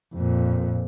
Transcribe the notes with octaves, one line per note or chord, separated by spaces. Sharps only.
F2 A#2